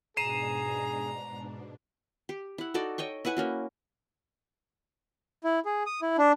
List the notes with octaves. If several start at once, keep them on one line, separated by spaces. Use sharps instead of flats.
G#2 B2 D4 G#4 A#5 C7 D#7 E7
G4
E4 F#5
D#4 F#4 A4 D5
C#5 D#5 G5 C#6
E4 B4 F#5 G#5
A#3 C#4 F#4
E4
G#4
D#6
E4
D4